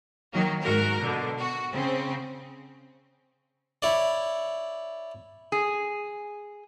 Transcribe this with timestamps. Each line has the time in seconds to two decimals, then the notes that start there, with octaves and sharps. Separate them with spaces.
0.33 D#3 F#3 A#3
0.62 G#2 F#4 A#4
1.01 B2 D3
1.39 F#4
1.73 C#3 C4
3.82 E4 C#5 D5
5.52 G#4